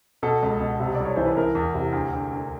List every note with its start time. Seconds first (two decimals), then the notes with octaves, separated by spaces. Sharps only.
0.23 B2 A4
0.43 C#2
0.60 B2
0.80 C3
0.95 C2 D5
1.05 C#5
1.16 E3 C5
1.26 B4
1.37 E3 A#4
1.55 E2
1.74 C3
1.92 D2
2.12 D2
2.31 D2